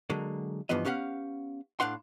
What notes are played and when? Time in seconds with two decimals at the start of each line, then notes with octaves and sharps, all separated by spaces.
0.10 D3 F#3 G#3 A#3
0.69 C2 G2 E3 F3 B3 D#5
0.85 B3 C#4 G4 F5 F#5
1.80 A2 D4 F5 F#5 C6